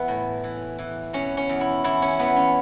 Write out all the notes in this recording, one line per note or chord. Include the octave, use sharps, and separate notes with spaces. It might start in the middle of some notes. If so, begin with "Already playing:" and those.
Already playing: E3 B3
A2
E3
E3
B2 C#4
C#4
E2
E4
E2 E4
C#4
E2 B3
C#4